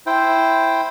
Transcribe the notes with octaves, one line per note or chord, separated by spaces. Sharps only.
E4 C5 G5